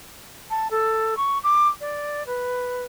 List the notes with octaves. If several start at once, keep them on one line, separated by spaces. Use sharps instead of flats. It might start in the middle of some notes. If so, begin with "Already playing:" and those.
A5
A4
C#6
D6
D5
B4